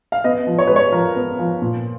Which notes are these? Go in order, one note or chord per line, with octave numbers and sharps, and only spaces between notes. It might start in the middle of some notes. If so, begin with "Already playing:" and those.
F5
B3 D#5
F3
C#5
G#3 B4
C#5
F3 A#4
B3
F3
A#2